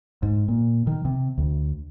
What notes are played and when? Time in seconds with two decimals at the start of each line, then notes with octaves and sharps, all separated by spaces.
0.23 G#2
0.48 A#2
0.87 D#3
1.05 C3
1.38 D2